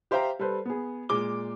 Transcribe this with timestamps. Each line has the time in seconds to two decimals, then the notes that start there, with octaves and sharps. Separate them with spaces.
0.11 G4 C5 E5 F5 G5 A#5
0.39 G3 A4 B4 C5
0.66 B3 G#4
1.09 A#2 G#3 D6 G7